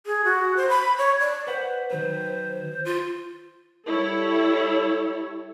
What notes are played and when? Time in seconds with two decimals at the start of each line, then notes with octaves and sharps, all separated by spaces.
0.06 G#4
0.24 F#4
0.57 C5
0.69 B5
0.98 C#5
1.20 D5
1.47 B4 C5 F#5
1.91 D#3 F#3 B4 C5
2.85 F4
3.88 G3 E4 A4 C#5